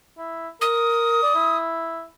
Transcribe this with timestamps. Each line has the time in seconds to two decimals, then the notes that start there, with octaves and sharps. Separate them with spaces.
0.18 E4
0.61 A#4 D#6
1.23 D5
1.35 E4